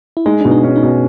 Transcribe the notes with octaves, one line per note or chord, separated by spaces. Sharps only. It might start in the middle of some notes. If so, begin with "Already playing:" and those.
E4
G#3 D#4
B2 D4
D#4
C#4
D#4
B2